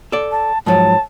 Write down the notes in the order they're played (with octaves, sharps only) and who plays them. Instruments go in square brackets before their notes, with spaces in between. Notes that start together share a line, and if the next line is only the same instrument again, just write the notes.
[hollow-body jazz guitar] A4 D5
[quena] A5
[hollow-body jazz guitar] G#2 F3 F#3 [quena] A5